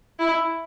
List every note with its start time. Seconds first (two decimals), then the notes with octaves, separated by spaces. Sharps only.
0.19 E4